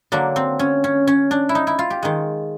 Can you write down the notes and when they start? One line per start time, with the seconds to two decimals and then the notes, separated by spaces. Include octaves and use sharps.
0.12 D3 F#3 A#3 D4
0.36 C4
0.59 C#4
0.84 C#4
1.07 C#4
1.31 D4
1.49 E4
1.55 D#4
1.67 E4
1.79 F4
1.90 G4
2.03 D#3 G#3